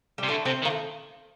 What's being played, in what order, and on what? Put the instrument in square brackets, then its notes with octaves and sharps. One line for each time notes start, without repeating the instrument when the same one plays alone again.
[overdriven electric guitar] C3 [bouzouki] G3
[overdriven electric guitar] D3 [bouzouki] A3
[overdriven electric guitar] C3 [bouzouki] C4
[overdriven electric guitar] D#3
[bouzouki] A#3
A3